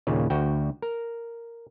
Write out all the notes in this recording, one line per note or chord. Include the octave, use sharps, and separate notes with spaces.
D#2 A#2 C#3
D2 F#4 G5
A#4